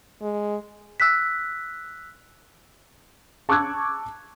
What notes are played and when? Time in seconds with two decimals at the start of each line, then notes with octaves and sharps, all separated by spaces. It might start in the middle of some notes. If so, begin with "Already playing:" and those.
0.22 G#3
1.00 E6 F#6 B6
3.49 A5 C#6 D6 E6 F#6 G#6